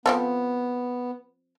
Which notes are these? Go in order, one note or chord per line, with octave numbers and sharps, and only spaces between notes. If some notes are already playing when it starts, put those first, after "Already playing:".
F3 B3 C4 A4